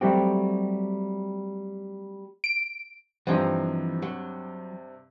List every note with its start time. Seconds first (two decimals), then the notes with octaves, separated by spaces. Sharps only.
0.01 F#3 G3 A3 C4 F#4 G4
2.44 D7
3.27 G2 C3 E3 F3 C4 D#4
4.02 F#3